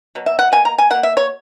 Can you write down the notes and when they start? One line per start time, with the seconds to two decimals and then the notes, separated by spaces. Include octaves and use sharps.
0.15 B2 F#3
0.26 E5
0.39 F#5
0.52 B2 A#3 G#5
0.65 A#5
0.78 G#5
0.90 A#3 F#5
0.95 B2
1.03 E5
1.17 C#5